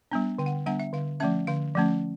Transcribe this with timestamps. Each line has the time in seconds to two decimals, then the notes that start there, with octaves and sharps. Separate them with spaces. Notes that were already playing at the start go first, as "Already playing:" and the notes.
0.12 G3 B3 D4
0.38 D3 G5
0.46 F#5
0.52 G5
0.66 G3 B3 D4 F#5
0.80 E5
0.93 D3 F5
1.20 F3 A3 C#4 E5
1.47 D3 F5
1.75 F3 A3 C#4